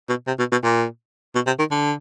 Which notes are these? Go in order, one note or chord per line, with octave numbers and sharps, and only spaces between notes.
B2
C3
B2
B2
A#2
B2
C3
D#3
D3